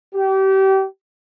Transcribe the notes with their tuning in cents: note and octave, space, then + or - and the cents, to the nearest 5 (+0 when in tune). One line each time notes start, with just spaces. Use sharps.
G4 -30